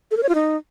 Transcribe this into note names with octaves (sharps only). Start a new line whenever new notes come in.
A4
A#4
C#5
F4
D#4